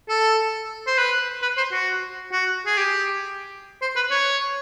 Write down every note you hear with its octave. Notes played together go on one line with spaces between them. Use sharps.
A4
C5
B4
B4
C5
F#4
F#4
G#4
G4
C5
B4
C#5